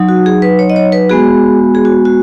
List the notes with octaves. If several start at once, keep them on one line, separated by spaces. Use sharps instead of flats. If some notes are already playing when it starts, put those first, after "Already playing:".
Already playing: F#3 D#4
F#4
G#4
B4
C#5
D#5
C#5
B4
G#3 B3 F#4 G#4
G#4
F#4
F#4